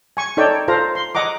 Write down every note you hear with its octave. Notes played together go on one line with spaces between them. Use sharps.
G#5 C#6
D#4 A4 C#5 D5 G5 A5
F4 A4 C5 F5 A#5
C6
D#5 F#5 A#5 D6